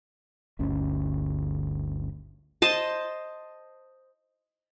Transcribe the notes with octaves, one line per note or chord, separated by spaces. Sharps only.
G1 D2 C#4
C5 D#5 A5